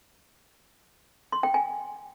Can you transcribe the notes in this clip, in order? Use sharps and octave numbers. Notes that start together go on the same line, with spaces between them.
C6
G5
G#5